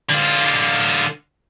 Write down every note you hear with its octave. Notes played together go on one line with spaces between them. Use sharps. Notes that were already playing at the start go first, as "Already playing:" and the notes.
D3 F4